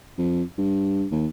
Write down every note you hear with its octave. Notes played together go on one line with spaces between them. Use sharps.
F2
G2
D#2